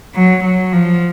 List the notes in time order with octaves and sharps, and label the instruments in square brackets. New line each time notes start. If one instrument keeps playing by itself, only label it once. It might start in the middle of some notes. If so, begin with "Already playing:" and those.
[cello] F#3
F#3
F3